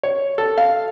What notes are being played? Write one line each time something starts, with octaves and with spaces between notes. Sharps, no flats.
C#5
A4
F5